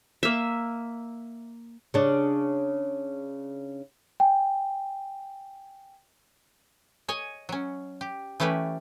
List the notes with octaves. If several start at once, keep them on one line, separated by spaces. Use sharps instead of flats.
A#3 E5
C#3 D4
G5 G#5
C#5 D#5 G#5
F#3 C#4
G4
E3 A3 C#4 G4 B4